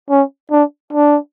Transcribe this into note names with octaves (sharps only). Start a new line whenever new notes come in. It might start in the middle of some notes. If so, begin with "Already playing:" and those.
C#4
D4
D4